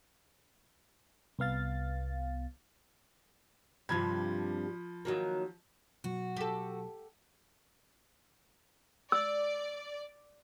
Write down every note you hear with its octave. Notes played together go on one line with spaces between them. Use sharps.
C2 B3 F5 A6
G2 C3 F3 B5 G#6
D#3 F#3 A#3
B2 F#3 F#4
G4 A4
D5 E6